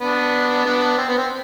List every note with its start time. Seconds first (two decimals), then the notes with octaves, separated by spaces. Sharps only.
0.01 B3 D4
0.65 B3 D4
0.98 C4
1.08 B3
1.18 C4